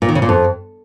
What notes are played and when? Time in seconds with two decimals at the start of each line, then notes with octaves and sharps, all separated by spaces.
0.02 A#2
0.09 D#3
0.15 C#3
0.22 A#2
0.29 F2